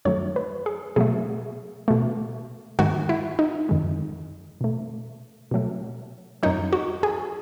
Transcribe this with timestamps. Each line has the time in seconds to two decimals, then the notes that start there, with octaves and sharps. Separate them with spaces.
0.05 F#2 D#3 F#3 A3 C#5
0.36 B4
0.66 G#4
0.96 B2 F#3 A3 G#4
1.88 B2 A3
2.79 G#2 D#3 G#3 F#4
3.09 E4
3.39 D#4
3.69 F#2 D#3 G#3
4.61 B2 A3
5.51 B2 F#3 A3
6.43 F#2 D#3 F#3 D#4
6.73 F#4
7.03 G#4